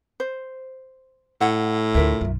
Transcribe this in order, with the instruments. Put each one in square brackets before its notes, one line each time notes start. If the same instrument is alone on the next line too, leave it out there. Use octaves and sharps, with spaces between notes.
[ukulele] C5
[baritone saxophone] A2 [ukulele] F#5
[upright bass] D2 D3 [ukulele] F4 A#4 E5
[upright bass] B1 F#2